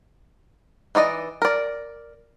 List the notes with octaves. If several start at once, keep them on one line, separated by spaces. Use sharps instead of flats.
E3 D#4 D5 D#5
A#4 D5